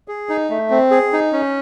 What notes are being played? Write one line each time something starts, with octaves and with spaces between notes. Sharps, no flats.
G#4
D#4
A3
C4
G#4
D#4
C#4